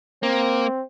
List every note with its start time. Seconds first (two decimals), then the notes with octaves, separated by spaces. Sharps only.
0.23 A#3 C4